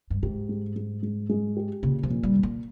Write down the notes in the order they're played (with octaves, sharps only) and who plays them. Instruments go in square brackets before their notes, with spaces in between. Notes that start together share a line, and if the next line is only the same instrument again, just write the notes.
[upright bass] G2
[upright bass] G#2 [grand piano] G4
[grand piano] G#3
G#3
G#3
G#3
G4
[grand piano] A#2 [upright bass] C#3
[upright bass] F3
[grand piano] A#2
[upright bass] G3
[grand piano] A#2
[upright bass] A#3